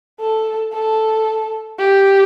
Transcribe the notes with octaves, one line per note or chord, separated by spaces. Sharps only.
A4
A4
G4